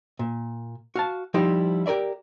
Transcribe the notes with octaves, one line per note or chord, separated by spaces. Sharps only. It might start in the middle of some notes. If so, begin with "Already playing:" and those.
A#2
F#4 F5 A5
F3 G3 D#4 E4 G4 C5
G4 A#4 B4 D5 E5